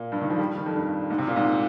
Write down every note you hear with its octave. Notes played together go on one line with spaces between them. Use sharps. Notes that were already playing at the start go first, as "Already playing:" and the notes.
Already playing: A#2
G2
D#3
F3
G3
D#3
F2
G2
G#2
C3
A#2
G#2